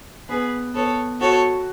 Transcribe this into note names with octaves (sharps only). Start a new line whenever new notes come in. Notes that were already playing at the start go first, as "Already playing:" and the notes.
B3 G#4 B4
B3 A4 C#5
F#4 A4 C#5